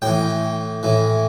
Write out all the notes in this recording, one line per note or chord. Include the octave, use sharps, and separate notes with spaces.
A2 E3 G5
A2 E3